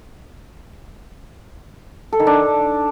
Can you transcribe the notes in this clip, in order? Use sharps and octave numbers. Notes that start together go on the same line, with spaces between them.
A4
D#3
D4